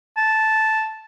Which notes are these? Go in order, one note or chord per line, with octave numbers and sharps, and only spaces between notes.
A5